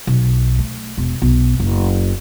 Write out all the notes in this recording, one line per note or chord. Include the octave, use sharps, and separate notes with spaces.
B1
A3
E1
B1
F#1